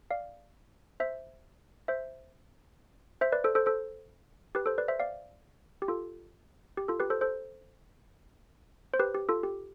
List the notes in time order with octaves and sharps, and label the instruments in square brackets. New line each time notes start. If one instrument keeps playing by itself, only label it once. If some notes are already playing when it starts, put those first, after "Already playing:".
[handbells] D5 F5
C5 E5
C5 E5
C5 E5
B4 D5
A4 C5
A4 C5
A4 C5
G4 B4
A4 C5
B4 D5
C5 E5
D5 F5
G4
F4 A4
G4
F4 A4
G4 B4
A4 C5
A4 C5
C5
G4 B4
G4
F4 A4
G4